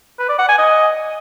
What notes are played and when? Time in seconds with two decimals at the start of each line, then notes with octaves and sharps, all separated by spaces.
0.19 B4
0.29 D5
0.39 F#5
0.49 G#5
0.58 D#5